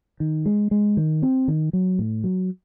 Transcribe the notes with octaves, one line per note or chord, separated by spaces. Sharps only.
D#3
G#3
G#3
D#3
C4
D#3
F#3
A2
F#3